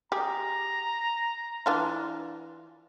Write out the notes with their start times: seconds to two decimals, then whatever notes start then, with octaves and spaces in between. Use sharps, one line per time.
0.12 G4 G#4 A#5
1.66 E3 D4 F4